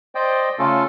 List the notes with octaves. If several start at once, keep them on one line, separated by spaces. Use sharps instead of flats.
C5 D5 D#5 G5
C#3 A3 C#4 F4 A4